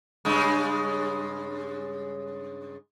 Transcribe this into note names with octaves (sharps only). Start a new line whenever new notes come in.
G2 C#3 G#3